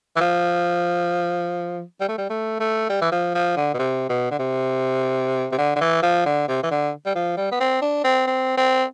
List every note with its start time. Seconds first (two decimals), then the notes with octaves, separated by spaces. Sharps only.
0.16 E3
0.21 F3
2.01 G3
2.09 A3
2.18 G3
2.30 A3
2.60 A3
2.89 G3
3.01 E3
3.12 F3
3.34 F3
3.57 D3
3.74 B2
3.79 C3
4.09 B2
4.31 D3
4.39 C3
5.52 C3
5.58 D3
5.76 D3
5.81 E3
6.02 F3
6.26 D3
6.48 C3
6.63 E3
6.71 D3
7.06 G3
7.15 F3
7.37 G3
7.52 B3
7.60 C4
7.82 D4
8.04 C4
8.27 C4
8.57 C4